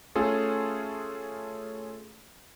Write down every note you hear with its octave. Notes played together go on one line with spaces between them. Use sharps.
A3 C#4 F4 G#4 A4